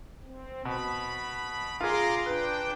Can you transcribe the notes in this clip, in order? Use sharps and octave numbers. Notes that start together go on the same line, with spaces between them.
C4
B2 B5
F4 G#4 A#5 C6 D6
D4 B4 G5